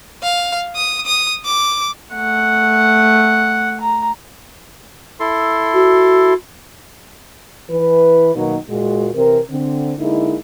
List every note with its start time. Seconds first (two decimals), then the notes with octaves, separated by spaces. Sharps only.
0.23 F5
0.76 D#6
1.06 D#6
1.45 D6
2.15 A3 F#5
3.80 A#5
5.20 E4 A4 C6
5.73 F#4
7.70 E3 B4
8.36 B2 D#3 F#3 A#3 B3 D#4
8.68 A#2 G#3 F#4
9.15 C3 E3 C4 A#4
9.50 D3 C4
9.98 D3 G#3 A#3 D#4 E4